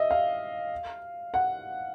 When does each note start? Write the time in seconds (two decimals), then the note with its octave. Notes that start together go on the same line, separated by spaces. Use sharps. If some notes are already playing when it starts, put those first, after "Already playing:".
Already playing: D#5 E5
0.11 F5
1.34 F#5